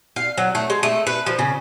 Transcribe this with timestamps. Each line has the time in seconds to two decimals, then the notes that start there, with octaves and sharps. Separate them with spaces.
0.16 F5
0.38 F#3
0.55 A3
0.70 G#3
0.83 A3
1.07 B4
1.26 F3
1.39 C#3